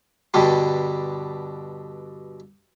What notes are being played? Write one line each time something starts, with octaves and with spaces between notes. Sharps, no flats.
G2 B2 D3 G3